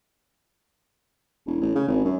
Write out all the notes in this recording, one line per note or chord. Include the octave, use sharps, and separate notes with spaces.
E1
A1
C#3
G#1
F#2